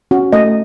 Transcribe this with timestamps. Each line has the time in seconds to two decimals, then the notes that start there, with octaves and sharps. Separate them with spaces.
0.11 C#4 F#4
0.33 A3 D#5